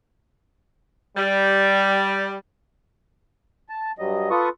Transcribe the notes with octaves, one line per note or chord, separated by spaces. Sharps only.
G3
A5
G2 F#3 G3 D#5
F4 A4 B4 C#6 D#6